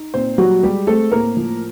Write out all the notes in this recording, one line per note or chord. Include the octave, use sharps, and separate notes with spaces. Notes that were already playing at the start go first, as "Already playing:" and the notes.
Already playing: D#4
A#2 C4 C5
F#3 G3 F#4
G3 G#3 G4
A3 C4 A4
A2 A#3 A#4
F3